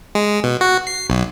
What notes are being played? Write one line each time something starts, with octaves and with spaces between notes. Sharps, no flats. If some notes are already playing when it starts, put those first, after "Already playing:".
G#3
B2
F#4
C7
B1